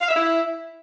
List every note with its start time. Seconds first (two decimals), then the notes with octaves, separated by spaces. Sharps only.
0.01 F5
0.08 E5
0.15 E4